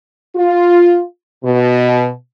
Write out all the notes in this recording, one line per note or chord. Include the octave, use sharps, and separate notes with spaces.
F4
B2